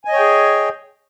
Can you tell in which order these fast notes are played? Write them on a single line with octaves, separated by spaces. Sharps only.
G#5 D#5 C#5 G5 G#4